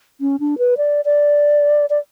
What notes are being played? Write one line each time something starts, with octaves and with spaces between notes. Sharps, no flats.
C#4
D4
B4
D5
D5
D5